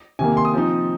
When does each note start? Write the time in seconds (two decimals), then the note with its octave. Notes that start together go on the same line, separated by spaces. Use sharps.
0.19 C3 D#3 A#3 G#5
0.37 C6
0.45 D#6
0.53 F3 C4 D#4